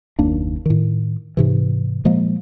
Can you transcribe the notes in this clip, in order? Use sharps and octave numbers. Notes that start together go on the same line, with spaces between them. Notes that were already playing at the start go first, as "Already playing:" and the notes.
F#1 D#2 A#3 D4
A2 D#3
G#2 C3 E3
A#2 F3 G#3 A#3